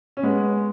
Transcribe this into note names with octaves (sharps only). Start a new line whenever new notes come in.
C#4
G#3 B3